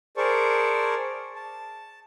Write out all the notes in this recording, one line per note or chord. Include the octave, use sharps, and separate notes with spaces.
G#4 A#4 C5 D5 A5 C#6
A5